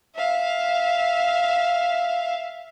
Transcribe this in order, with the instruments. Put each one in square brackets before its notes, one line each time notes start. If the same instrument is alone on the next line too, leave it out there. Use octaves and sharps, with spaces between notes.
[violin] E5 F5